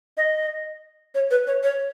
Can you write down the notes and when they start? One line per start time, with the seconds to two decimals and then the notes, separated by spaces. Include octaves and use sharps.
0.17 D#5
1.15 C#5
1.31 B4
1.47 C#5
1.63 C#5